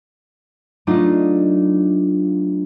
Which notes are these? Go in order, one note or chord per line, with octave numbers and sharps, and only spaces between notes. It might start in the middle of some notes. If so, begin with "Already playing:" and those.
F#3 A3 D4 D#4 F4 D#5